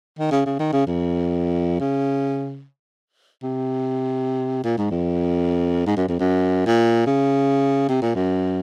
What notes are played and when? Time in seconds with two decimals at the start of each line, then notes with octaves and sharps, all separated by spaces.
0.19 D#3
0.31 C#3
0.46 C#3
0.59 D#3
0.73 C#3
0.86 F2
1.80 C#3
3.43 C3
4.64 A#2
4.78 G#2
4.91 F2
5.86 G#2
5.97 F#2
6.08 F2
6.19 F#2
6.67 A#2
7.07 C#3
7.88 C3
8.02 A#2
8.15 F#2